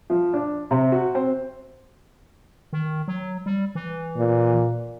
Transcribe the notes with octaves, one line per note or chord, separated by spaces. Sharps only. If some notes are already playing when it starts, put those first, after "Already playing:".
F3
D4
C3
F#4
C4
D#3
F#3
G3
E3
A#2